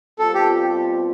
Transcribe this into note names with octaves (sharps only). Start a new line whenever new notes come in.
B2 G3 C4 F4 A4
G4